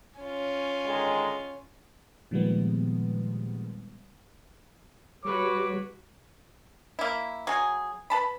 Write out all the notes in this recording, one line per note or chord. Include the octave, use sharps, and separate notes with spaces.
C#4 F4
D3 D#3 G#3
A#2 D#3 F3 G3 G#3 B3
G3 F#4 B4 C#5 D6
A#3 E4
F#3 G#4
B4 A5 B5